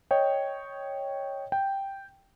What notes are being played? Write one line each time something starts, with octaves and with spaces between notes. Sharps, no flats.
C#5 D#5 G5
G5